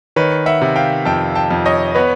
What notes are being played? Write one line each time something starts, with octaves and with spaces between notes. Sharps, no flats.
D#3 B4 C#5
E5 F#5
C3
F5 G5
F2 G5 A5
G5 A5
F2
C#5 D#5
B3 B4 C#5